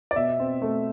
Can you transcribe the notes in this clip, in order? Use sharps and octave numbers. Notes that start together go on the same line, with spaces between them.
D5
B2 E5
C4
A3